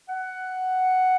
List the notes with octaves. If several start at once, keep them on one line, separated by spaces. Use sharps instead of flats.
F#5